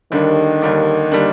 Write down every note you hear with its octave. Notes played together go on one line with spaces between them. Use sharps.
D#2 D3 D#3 G3 A#3 D4
D#2 D3 G3 A#3 D4
D3 G3 A#3 D4